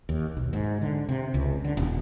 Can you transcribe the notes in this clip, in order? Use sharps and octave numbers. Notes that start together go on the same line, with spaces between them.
D#2
B1
G#2
D3
C3
C#2
D3
D#1